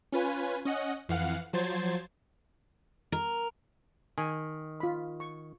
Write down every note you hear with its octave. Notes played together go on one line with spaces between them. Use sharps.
C#4 F4 B4 G#5
C#4 D#5 F#5
F2 E3 F5 F#5
F3 F#3 C5 G#6 A6
A#4
D#3 G#5
F4 B5
C#6